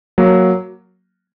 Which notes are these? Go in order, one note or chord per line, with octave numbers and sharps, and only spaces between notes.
F#3 A#3